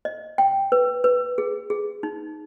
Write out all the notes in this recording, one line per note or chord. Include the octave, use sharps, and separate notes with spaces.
D#5
G5
B4
B4
G#4
G#4
D#4